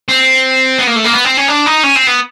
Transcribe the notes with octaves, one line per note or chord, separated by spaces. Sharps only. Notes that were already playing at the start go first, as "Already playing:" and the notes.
C4
B3
A#3
A3
A#3
B3
C4
C#4
D4
D#4
C#4
C4
B3